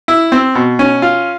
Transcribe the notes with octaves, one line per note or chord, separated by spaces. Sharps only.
E4
C4
B2
C#4
F4